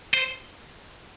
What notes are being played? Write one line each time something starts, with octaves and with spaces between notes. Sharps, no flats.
C5